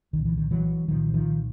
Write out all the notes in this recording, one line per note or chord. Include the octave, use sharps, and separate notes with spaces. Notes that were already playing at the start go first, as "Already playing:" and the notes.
C2 A#2 D#3
E3
D#3
E3 F#3
C2 A#2 D#3 F3
D#3 F3